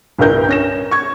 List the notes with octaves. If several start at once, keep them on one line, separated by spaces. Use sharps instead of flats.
G1 C2 G2 A#4 G6
C#4 A#6 E7
C#6 G#6